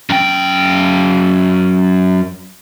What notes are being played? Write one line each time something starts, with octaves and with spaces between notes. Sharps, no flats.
F#2 G5